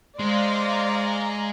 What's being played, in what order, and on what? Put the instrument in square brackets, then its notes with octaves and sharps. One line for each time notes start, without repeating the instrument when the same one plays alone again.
[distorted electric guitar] G#3 [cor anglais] C5 [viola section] D5 F5 A#5